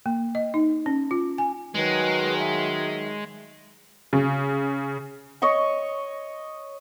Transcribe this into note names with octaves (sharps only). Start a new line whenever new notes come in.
A#3
D#5
D#4
C#4
F4
G#5
D#3 F#3 G#3 B4
E5
C#3
C#5 D#5 C#6